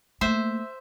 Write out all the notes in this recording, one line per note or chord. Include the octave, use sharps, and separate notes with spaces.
A3 A#3 C5 E5